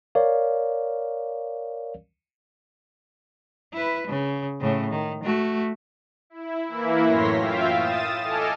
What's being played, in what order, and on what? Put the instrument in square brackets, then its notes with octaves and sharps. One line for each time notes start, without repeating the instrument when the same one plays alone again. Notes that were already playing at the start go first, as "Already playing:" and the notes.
[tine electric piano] A#4 C#5 D5 F5
[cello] E4 B4
C#3
A2 C#3
D#3
A3 F#4
[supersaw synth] E4
E3 A#3 E4
F#2 A2 C#5 C6 A#6 B6
F4 E5 F5 G5
D#6 A6 E7
A4 D#5 G#5 A5 D6 F6